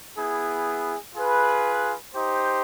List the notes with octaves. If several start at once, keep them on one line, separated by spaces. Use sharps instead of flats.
B3 E4 G#4
F4 G#4 B4
D#4 G4 C5